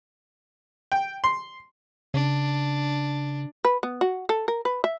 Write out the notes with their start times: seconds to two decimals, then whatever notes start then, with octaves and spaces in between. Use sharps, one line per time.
0.92 G5
1.24 C6
2.14 C#3 D4
3.65 B4
3.83 B3
4.01 F#4
4.29 A4
4.48 A#4
4.65 B4
4.84 E5